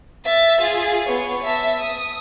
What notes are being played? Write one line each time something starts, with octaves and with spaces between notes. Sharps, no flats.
E5 A6
F4 G#4
B3 C#5
E5 A5
D#6